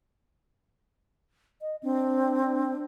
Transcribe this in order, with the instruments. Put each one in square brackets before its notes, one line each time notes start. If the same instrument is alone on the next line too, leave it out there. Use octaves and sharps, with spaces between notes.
[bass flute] D#5
[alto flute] C4 [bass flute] D4